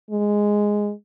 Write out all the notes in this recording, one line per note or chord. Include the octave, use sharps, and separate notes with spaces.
G#3